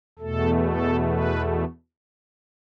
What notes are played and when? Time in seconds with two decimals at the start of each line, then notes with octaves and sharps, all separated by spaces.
0.19 E2 B2 A3 A4
0.65 A4
1.10 B4